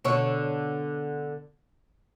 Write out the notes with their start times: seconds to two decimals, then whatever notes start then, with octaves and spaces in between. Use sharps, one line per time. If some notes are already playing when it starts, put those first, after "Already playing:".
0.04 B2 D3 C#5